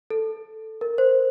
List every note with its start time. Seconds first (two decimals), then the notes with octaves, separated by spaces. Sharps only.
0.10 A4
0.81 A#4
0.98 C5